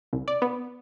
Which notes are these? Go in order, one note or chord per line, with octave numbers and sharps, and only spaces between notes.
C2
D5
B3